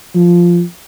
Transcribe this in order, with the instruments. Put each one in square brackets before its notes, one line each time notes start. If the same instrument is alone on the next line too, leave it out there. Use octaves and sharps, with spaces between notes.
[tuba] F3